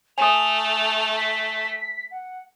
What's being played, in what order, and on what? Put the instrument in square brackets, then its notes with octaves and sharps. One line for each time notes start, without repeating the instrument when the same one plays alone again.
[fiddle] A3 [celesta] G#5 D#6 [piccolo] F7
[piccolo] B6
F#5